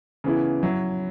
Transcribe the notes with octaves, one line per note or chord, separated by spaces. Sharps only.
C#3 E3 B3 E4
F#3 E4